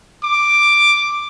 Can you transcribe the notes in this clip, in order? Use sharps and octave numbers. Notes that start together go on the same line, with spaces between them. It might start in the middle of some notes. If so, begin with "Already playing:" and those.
D6